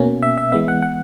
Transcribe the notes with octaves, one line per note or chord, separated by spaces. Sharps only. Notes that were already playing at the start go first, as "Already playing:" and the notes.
Already playing: B2 A#3 C#4
E5
E5
E3 G#3 B3 E5
F#5
F#5